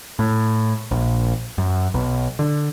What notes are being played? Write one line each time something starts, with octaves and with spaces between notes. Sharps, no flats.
A2
A#1
F#2
B1
D3